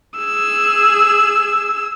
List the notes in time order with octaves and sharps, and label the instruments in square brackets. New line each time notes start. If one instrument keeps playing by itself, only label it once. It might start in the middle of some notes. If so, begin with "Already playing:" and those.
[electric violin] G#4 E6